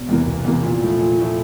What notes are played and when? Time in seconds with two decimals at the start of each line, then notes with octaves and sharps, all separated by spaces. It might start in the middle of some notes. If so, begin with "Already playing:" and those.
Already playing: E1
0.09 E2 C3 E3 A#3
0.26 E1
0.45 E2 C3 E3 A#3
0.63 A#2
0.81 F3 A3 E4
0.99 A#2
1.18 F3 A3 E4